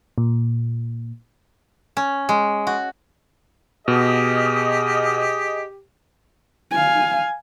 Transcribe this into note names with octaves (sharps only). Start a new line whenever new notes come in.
A#2
C#4
G#3
F#4
B2 G4 G#4 D#5
F5 G#5